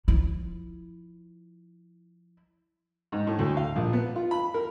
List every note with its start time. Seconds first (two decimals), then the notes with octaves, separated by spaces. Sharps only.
0.08 F3 E4
3.12 G#2
3.27 A2
3.39 D2
3.57 F5
3.76 A#1
3.93 B3
4.16 F4
4.31 B5
4.54 A#4